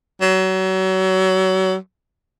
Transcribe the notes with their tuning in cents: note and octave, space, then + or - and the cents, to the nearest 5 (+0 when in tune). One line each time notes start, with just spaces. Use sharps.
F#3 +30